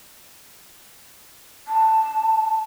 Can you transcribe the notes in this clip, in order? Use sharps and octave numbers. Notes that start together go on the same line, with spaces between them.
A5